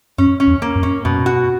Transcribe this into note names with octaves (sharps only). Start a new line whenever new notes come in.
F#2 C#4
C#4
E2
A#3
F#2
C#4
F#2 B2
F#4